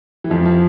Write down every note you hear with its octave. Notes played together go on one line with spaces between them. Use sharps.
E3
F2 F3
F3